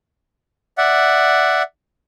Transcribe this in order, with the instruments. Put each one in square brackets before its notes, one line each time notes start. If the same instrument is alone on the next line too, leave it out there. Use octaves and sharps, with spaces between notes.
[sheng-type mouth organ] D5 E5 F#5